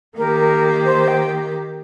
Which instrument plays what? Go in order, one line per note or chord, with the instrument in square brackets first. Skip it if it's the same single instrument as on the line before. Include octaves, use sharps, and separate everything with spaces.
[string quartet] D#3 A#3 G4 [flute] A#4
[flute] A#4
C5
G5